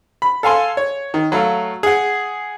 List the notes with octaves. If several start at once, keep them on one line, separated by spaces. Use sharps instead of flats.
B5
A4 F5 G#5 C6
C#5
D#3
F#3 A3 F5
G#4 F#5